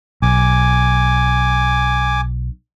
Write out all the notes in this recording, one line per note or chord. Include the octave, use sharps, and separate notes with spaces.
B1 G#5 D6